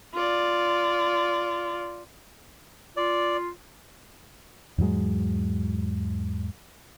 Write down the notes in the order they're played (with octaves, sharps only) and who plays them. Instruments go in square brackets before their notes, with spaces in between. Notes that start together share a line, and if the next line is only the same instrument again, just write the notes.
[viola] F4 D5
[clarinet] F4 [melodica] D5
[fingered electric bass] E2 G#2 F#3 G#3